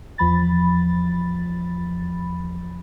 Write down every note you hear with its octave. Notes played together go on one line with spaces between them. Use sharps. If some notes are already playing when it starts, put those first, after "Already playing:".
E2 F3 B5 A6